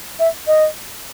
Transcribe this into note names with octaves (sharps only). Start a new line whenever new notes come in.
E5
D#5